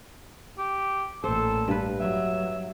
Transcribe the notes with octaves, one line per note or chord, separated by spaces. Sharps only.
G4
A1 A#2 A4 C5
G2 B4
F#3 E5